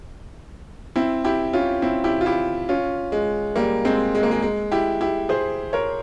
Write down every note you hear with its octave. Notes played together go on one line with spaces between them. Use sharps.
C4 E4
E4 G4
C#4 F4
C4 E4
E4 G4
F4
E4 G4
C#4 F4
G#3
G3 A#3
G#3 C4
G#3
A#3
G#3
G#3
E4 G4
E4 G4
G#4 C5
A#4 C#5